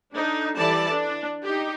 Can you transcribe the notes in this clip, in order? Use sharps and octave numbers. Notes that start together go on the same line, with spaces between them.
D4 D#4 A4
E3 G3 A4 D5 A5
D4
D#4 G4